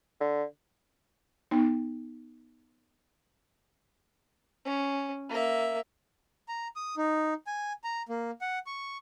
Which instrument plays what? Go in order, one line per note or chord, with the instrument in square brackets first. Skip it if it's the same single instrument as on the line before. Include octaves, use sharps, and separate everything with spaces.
[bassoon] D3
[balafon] B3 D#4
[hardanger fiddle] C#4
A#3 E5
[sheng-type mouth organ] A#5
D#6
D#4
G#5
A#5
A#3
F#5
C#6